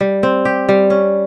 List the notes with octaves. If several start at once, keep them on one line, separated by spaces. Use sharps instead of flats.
G3
C4
G4
G3
C#4